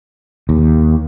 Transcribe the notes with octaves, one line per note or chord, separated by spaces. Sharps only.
D#2